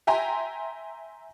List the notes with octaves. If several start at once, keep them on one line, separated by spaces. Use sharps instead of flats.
E5 G5 G#5 A#5 C6